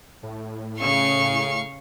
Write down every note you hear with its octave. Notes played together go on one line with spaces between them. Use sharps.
A2
C#3 F5 C#6